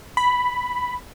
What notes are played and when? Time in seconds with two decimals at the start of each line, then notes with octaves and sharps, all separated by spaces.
0.17 B5